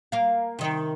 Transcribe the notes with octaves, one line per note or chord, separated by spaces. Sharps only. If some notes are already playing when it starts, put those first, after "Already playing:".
A#3 F5
C3 D#3